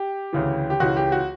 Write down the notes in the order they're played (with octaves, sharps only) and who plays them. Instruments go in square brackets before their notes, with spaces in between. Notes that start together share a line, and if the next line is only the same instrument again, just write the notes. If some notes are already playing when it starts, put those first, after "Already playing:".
Already playing: [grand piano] G4
D2 C#3 E3
G4
C#2 C#3 E3 F#4
G4
F#4